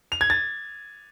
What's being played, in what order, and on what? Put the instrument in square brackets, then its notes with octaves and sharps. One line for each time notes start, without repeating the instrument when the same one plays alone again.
[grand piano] F7
G#6
A6